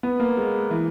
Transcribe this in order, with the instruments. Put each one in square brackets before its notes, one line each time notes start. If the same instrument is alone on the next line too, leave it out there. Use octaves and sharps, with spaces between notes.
[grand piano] B3
A#3
G#3
E3